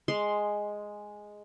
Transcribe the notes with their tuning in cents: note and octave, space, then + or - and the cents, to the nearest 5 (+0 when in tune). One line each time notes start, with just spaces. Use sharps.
G#3 +0 C6 +0